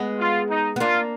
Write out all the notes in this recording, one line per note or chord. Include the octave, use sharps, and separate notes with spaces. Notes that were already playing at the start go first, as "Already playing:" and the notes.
Already playing: G#3 B3
F4
D#4
B3
A#3 D4 F4